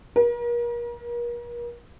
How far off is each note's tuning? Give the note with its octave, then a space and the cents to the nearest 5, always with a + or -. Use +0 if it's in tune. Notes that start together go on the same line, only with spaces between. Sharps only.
A#4 +40